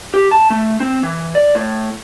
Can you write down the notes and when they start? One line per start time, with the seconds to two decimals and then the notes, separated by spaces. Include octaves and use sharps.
0.14 G4
0.31 A5
0.50 A3
0.80 C4
1.03 E3
1.35 D5
1.55 A2